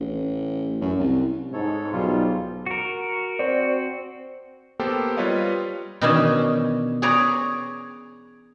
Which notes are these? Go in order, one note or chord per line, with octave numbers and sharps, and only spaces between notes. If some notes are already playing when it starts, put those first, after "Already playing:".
A1
F#2
C2
G#2 A4 C#5
B1 F3 G3 F4
F#4 A#4
C4 F#4 C5 D5
A#3 B3 G4 A4 C5 G5
G3 F4 B4 C#5 D#5 F5
B2 D#3 E3 C#4 D4 G#5
G#4 B4 C#5 D5 G#5 A#5